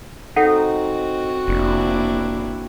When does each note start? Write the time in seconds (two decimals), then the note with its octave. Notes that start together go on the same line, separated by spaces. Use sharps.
0.36 C4 D#4 F#4 A4 F#5
1.48 F1 A#3 D4 E4